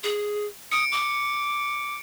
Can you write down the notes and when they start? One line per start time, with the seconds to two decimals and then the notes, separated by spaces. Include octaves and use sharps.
0.03 G#4
0.72 D#6 C#7 D7
0.92 D6